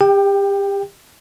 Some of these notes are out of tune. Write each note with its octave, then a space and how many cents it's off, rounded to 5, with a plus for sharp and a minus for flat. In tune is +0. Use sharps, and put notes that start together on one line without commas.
G4 +30 G5 +5